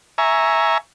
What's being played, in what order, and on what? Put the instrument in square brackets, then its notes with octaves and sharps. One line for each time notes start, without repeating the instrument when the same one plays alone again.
[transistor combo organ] E5 G#5 A#5 C#6